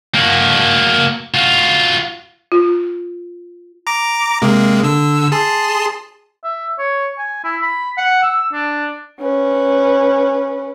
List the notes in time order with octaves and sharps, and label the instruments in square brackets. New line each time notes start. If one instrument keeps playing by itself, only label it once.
[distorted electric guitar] A#3 F#4
F4 F#4
[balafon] F4
[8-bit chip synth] A#5 D6
C3 G#3 A#3
D3 E6
G#4 A5 C6
[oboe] E5
C#5
G#5
E4
B5
F#5
E6
D4
[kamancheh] C#4 B4